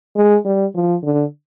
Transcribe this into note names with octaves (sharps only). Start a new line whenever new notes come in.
G#3
G3
F3
D3